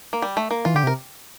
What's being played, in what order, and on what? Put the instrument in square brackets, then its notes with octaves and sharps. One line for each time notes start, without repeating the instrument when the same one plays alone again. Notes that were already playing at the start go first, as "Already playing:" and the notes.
[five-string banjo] A#3
G3
A3
A#3
[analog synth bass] E3 [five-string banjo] F4
[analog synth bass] D3 [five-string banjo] G4
[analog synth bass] C3 [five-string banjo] A#4